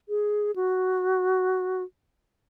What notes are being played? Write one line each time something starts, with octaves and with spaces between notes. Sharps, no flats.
G#4
F#4